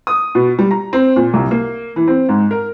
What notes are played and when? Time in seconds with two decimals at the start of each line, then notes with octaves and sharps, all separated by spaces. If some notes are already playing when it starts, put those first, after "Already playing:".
0.07 D#6
0.35 B2
0.59 G3
0.71 A#5
0.93 C4
1.16 A#2
1.34 C2
1.51 A#3
1.96 E3
2.08 C4
2.29 G#2
2.51 A#4